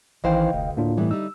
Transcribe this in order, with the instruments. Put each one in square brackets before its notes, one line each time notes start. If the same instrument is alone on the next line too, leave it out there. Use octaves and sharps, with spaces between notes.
[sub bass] A1 [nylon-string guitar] D#3 E3 C5 [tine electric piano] D#5 F5 G5
[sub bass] F1 [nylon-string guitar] D2
[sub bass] A2 [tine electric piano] A#3 D4 F4
[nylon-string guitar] G2 E3 B3 [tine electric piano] G3 A3
[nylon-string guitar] G3 D#4 [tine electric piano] E6